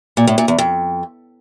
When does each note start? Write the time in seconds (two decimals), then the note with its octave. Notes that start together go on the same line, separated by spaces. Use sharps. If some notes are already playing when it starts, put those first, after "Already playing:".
0.17 A#2
0.27 A2
0.38 A#2
0.48 E2
0.58 F2